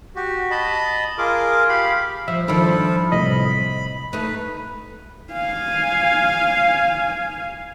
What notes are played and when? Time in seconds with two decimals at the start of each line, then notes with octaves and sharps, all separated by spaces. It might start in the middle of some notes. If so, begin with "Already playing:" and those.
0.16 F#4 G4
0.51 D#5 A5 B5
1.18 F4 G#4 A#4 D6
1.69 G4 F5 B5
2.28 F3 E5
2.48 D#3 F3 D4 E4 A4
3.12 C2 A2 D#5 B5
4.13 A3 D#4 B4
5.33 F5 G#5